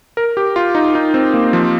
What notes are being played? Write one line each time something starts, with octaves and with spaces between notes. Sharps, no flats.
A#4
G4
F4
D#4
D#4
C4
A#3
F3